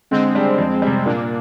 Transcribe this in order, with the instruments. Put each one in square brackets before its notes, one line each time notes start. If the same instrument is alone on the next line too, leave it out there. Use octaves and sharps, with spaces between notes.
[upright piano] D3 [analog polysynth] G#3 C4
[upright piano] G3 D4
F2
C3 G3
[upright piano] A#2 [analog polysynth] A#3 D4